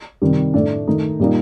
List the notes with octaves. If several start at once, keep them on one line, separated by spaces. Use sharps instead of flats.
C3 D#3 G3
A2 A3 D4
D#3 A3 D#4
A#2 G3 A#3 D#4